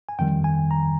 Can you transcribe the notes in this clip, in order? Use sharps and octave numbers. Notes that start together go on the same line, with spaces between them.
G#5
F2 D#3 G3 G5
G#5
A#5